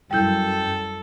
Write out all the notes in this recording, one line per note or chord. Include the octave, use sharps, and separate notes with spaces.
F#2 G3 E4 A4 G5 G6